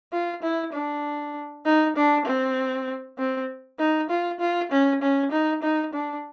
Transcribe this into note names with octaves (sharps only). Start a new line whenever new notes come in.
F4
E4
D4
D#4
D4
C4
C4
D#4
F4
F4
C#4
C#4
D#4
D#4
D4